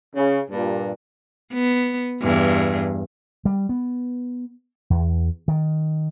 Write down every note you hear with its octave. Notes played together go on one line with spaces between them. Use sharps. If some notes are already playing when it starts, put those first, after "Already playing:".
C#3
G2 A#2
B3
E2 G2
G3
B3
E2
D#3